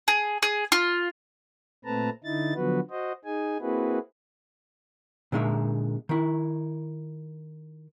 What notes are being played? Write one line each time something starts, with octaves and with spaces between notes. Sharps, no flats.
G#4
G#4
F4
A#2 A3 C4 B4 A5 A#5
D3 D#4 E4 A6
D3 F3 F#3 B3 F#4 B4
F#4 C5 D#5
D#4 G#4 G#5
A#3 C4 E4 F#4 G#4 B4
A#2 D3 G#3 D#4 E5
D#3 E4